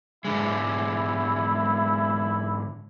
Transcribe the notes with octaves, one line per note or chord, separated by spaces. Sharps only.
G#2 D3 G#3 E4